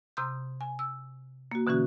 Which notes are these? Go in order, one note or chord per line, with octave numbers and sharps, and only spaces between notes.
C3 A#5 C6 D#6 G6
G#5
E6
A#3 F#4
B2 D3 E3 C#4 F#4